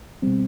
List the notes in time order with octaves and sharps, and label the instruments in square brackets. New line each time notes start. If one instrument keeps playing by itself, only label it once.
[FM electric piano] B2 G3 C4